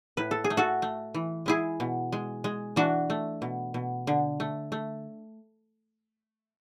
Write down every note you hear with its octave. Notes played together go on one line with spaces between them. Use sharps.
A2 B4
A4
G#4
A3
F#4 A4
A3
E3
G#3 E4 G#4
B2
G#3
G#3
E3 D4 F#4
A3
B2
B2
D3
A3
A3